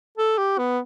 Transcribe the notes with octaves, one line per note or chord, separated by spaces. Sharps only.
A4
G4
B3